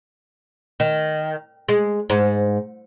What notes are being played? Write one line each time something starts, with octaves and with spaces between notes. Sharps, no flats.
D#3
G#3
G#2